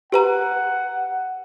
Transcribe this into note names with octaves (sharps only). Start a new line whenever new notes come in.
G4 B4 F#5 A#5